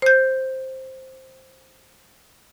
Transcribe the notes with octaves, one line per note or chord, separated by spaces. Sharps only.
C5 G6